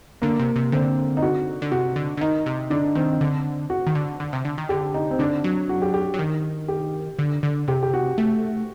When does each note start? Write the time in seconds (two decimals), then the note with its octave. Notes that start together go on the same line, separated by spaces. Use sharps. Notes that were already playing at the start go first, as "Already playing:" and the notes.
0.22 D3 A#3
0.39 C3
0.56 C3
0.72 D3 C4
1.17 D#4
1.22 F#4
1.62 D3
1.72 C3 F#4
1.96 D3
2.17 D3
2.21 D#3 D#4
2.46 C3
2.70 D3 D4
2.95 D#3 C4
3.21 D3
3.70 F#4
3.87 D#3
3.95 D3
4.20 D3
4.33 C3
4.45 D3
4.58 D#3
4.69 D3 G4
4.94 D#4
5.11 C4
5.19 D3 D4
5.44 F#3
5.69 F#4
5.82 G4
5.94 G4
6.14 F#3
6.19 D#3
6.68 G4
7.19 D3
7.43 D3
7.68 C3 G4
7.83 G4
7.94 F#4
8.18 A3